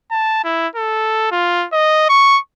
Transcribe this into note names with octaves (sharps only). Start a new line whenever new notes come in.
A5
E4
A4
F4
D#5
C#6